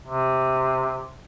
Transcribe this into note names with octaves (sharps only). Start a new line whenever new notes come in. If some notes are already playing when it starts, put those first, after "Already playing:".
C3